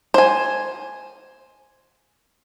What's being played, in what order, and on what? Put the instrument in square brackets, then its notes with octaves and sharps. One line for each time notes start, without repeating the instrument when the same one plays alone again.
[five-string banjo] C5 G#5